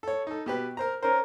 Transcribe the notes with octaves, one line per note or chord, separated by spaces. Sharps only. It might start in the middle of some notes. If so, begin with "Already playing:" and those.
A4 C#5
D#4 A4
B2 G4 B4
A#4 C5 A#5
C#4 A#4 C5